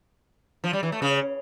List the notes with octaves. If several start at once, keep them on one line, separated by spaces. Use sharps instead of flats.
F3
G3
E3
A3
C#3